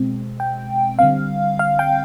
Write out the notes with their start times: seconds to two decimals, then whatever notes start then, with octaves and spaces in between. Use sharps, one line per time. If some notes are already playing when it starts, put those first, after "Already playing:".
Already playing: B2 G#3 C4
0.40 G5
0.99 D3 G3 C4 F5
1.59 F5
1.79 G5